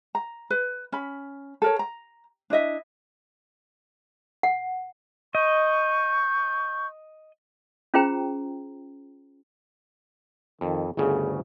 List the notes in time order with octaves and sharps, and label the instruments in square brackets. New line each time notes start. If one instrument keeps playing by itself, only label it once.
[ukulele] A#5
B4
C#4 B5
A4 A#4 C#5
A#5
D4 E4 D#5 E5
[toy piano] F#5
[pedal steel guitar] D#5 [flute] C#6 [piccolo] G6
[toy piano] C#4 F4 G#4 C5 G5 A#5
[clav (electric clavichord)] F2 [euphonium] D#3
[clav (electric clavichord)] G1 D2 C#3 [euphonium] G#4